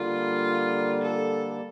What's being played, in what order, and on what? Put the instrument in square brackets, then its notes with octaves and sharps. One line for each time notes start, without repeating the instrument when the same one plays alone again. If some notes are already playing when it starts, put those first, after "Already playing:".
Already playing: [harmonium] D3 G3 A#3 [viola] F4
[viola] A4